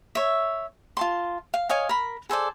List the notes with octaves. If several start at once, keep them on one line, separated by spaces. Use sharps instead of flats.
C#5 E5
F4 A5 C6
F5
C#5 D#5 F5 G#5
A#4 B5
G#4 A4 C5 D5